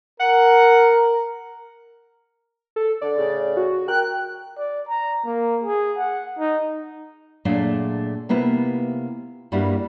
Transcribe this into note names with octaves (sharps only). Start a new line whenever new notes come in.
A#4 F#5
A4
D3 D5
A2 C#3
F#4
A#4 G5 F#6
D5
A#5
A#3
G#4
F#5
D#4
A#2 F#3 A3 D4 G#4 F5
C3 A#3 B3 E4 F4
G2 G3 A#3 E4 F#4